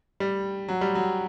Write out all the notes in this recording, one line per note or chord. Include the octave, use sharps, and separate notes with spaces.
G3
F#3
G3
F#3